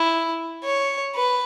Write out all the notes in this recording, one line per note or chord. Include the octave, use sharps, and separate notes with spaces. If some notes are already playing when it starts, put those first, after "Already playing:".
Already playing: E4
C#5
B4